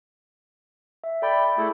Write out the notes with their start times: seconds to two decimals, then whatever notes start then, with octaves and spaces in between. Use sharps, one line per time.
1.04 E5
1.22 A4 D5 G5 B5
1.58 A3 E4 G#4 A4